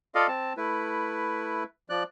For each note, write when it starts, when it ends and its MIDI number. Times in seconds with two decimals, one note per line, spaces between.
0.15 0.27 65
0.15 0.27 69
0.15 0.27 74
0.15 0.27 75
0.15 0.27 77
0.28 0.53 60
0.28 0.53 81
0.57 1.64 57
0.57 1.64 64
0.57 1.64 71
1.89 2.03 53
1.89 2.03 74
1.89 2.03 90